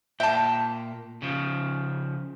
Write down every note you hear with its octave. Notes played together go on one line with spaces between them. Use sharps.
A#2 E5 G5 A5
C#3 F3